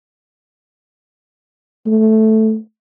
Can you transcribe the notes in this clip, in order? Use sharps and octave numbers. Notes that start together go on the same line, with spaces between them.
A3